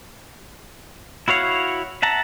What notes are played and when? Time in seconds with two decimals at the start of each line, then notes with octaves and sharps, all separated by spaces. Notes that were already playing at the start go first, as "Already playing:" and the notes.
1.28 E4 F#4 C#5 F5 F#5
2.02 E5 F#5 A5 A#5